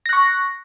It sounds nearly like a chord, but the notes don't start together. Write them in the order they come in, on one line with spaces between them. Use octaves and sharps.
A#6 F#6 C#6